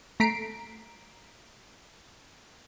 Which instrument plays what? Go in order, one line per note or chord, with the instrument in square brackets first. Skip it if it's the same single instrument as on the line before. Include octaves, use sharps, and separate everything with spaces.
[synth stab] A3 A#5 B6 C7 D7